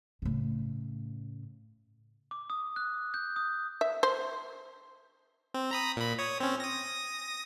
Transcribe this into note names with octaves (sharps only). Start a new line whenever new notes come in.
A2 C#3
D6
D#6
F#6
G6
D#6
E5
C5
C4
A#5 B5 D#6
A#2 B5
C#5 D#6
C4 C#4
D#6 A#6